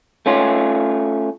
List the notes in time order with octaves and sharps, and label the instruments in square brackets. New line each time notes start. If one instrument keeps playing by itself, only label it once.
[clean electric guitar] A3 C#4 F4